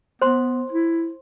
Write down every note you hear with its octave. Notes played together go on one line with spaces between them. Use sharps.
B3 C5 C6
E4